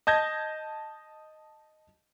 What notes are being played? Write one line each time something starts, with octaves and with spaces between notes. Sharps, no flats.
D#5 A5 G6 G#6 A#6